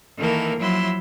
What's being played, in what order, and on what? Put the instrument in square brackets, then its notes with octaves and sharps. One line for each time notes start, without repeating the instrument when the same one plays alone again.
[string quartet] D#3 E3 A#3 A4 A#4
F3 F#3 E4 C6